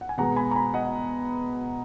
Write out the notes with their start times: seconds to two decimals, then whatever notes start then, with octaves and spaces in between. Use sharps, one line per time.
0.01 F#5
0.09 G#5
0.18 B2 G#3 B3 F#5 A#5
0.36 G#5 B5
0.51 A#5
0.55 G#5 B5
0.74 D#5 F#5